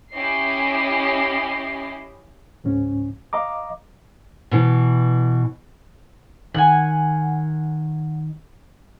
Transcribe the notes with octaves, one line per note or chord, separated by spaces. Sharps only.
C#4 E4 G4 D#5 C7
C#2 G#2 C#4
D#5 F5 A#5 D6
B2 E3
D#3 F#5 G#5